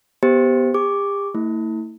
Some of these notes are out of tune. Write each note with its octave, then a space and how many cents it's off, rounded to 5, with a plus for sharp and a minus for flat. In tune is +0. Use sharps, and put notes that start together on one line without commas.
B3 +0 G4 +0 C5 +0
G4 +40 D6 +0
A3 +40 E4 -30